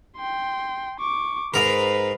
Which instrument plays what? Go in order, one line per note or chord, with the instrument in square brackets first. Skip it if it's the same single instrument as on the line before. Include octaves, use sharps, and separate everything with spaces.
[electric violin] G5 C6
C#6 D6
[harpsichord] G#2 A#4 [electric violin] B4